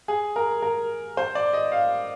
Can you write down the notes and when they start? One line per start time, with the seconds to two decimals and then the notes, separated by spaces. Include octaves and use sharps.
0.08 G#4
0.36 A#4
0.62 A#4
1.17 C5
1.35 D5
1.53 D#5
1.72 F5